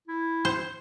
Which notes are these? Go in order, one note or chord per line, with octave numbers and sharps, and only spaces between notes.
E4
C5